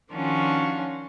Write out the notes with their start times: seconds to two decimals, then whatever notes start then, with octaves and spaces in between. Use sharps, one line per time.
0.11 D#3 F3 C#4 D4 F4 F#4